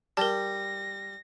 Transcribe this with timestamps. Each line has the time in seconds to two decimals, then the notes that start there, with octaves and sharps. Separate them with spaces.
0.17 G3 A#4 A5 A#6